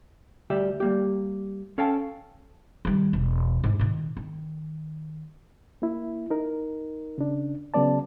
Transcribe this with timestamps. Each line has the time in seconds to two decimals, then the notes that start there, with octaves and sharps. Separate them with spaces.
0.50 D2 G3 G4 E5
0.80 G3 A#3 G4
1.78 C#4 A4 F5 G5 A5
2.85 D#3 G3
3.13 E1
3.64 G#2 E4
3.80 A#2 D#3
4.17 D#3
5.82 A#3 E4
6.30 D#4 A#4
7.18 C#3 D4
7.74 C#3 F#3 B3 D5 A5